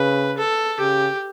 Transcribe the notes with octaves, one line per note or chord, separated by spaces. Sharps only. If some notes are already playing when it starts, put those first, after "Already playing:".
Already playing: C#3 B4
A4
C#3 G4